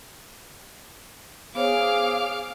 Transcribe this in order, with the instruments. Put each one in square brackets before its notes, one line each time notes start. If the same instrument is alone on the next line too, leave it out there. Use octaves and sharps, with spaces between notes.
[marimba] B3 C5 C#5 [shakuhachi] G#4 [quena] F5 [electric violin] D6 F6